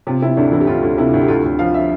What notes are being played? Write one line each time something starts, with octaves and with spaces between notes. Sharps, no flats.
C3 F4
C3 E4
D2 D4
E3 E4
G4
D2 F4
D2
C3 E4
D2
G4
D2 F4
D2
F3 F5
E5